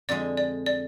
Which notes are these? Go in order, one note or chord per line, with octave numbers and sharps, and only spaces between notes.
F2 D3 G#3 D5
D5
D5